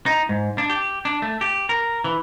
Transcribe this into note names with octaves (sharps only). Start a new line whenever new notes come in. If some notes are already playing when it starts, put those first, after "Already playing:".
D#4
G#2
D4
G4
D4
A3
G4
A#4
E3